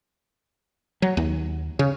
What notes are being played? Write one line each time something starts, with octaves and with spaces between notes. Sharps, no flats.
F#3
D#2
C#3